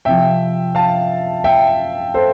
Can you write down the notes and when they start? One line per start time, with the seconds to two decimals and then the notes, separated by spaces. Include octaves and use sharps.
0.05 C3 F3 E5 G5
0.75 F5 A5
1.44 E5 G5
2.14 A4 C5